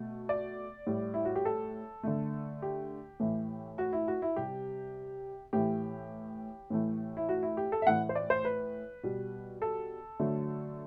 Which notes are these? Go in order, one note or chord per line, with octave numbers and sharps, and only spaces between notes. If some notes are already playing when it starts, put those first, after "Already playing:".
Already playing: B2 A3
D5
A2 G3
E4
F#4
G4
A4
D3 A3
G4
A2 E3 A3
F#4
E4
F#4
E4
C3 G3 G4
A2 E3 A3 G4
A2 E3 A3
E4
F#4
E4
G4
A4
E5
A2 E3 A3 F#5
C5
D5
C5
B4
B2 G3
A4
D3 F#3 A3